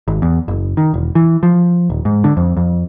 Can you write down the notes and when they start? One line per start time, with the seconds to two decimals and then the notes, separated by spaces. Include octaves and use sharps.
0.08 G#1
0.22 E2
0.48 F#1
0.77 D#3
0.94 E1
1.15 E3
1.43 F3
1.90 D#1
2.05 G#2
2.24 D3
2.37 F2
2.57 F2